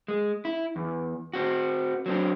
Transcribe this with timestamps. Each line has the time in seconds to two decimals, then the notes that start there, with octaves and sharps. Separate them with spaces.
0.08 G#3
0.45 E4
0.76 E2
1.33 C4 F#4
2.06 F#3 C4 D4